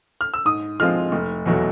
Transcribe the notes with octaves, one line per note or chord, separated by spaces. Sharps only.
F6
E6
G#2 D#6
F3 G#3 C4 F4 F6
F1
E2 B2 F#3 A3